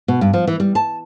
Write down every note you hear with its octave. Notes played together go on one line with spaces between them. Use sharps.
B2
G2
F3
E3
G3
A5